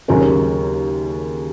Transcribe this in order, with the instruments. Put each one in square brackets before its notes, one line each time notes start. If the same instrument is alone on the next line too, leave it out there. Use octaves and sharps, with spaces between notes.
[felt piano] D#2 C#3 F#3 C#4 A#4